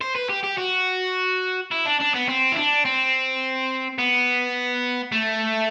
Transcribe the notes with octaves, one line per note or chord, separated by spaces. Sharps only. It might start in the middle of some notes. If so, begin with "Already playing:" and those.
C5
B4
G4
G4
F#4
E4
D4
D4
B3
C4
E4
D4
C4
B3
A3